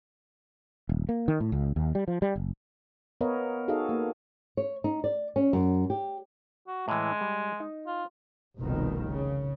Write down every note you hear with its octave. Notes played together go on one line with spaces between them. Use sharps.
D#1
A#3
D#3
A2
C#2
D#2
G3
F3
G3
F#1
B3 A#4 B4 C#5 D#5 F5
D#4 F#4 G#4 A4 D#5 F5
A#3
C#5
D#4
D5
C#4
F#2
G4
F#4
A2 E3 G#3
G3
D#4
F4
F1 C2 B2 D#3
C#3